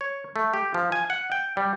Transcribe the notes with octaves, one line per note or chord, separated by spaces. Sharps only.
C#5
A3
G4
F3
G#5
F#5
G5
G3